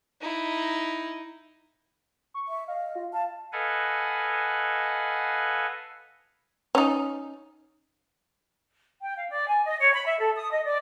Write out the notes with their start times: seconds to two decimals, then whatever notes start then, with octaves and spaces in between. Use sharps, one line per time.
0.21 D#4 E4
2.34 C#6
2.48 E5
2.68 D#5 F5
2.96 F4
3.13 F5 A5
3.53 A4 B4 D#5 F5 F#5 G#5
6.75 C#4 D#4
9.02 G5
9.16 F5
9.30 D5
9.48 G#5
9.65 D#5
9.80 C#5
9.94 B5
10.05 E5
10.19 A4
10.37 D#6
10.52 D#5
10.65 D5